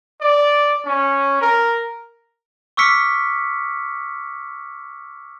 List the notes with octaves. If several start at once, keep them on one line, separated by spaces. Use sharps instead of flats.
D5
C#4
A#4
C#6 D6 E6 F6 B6 C#7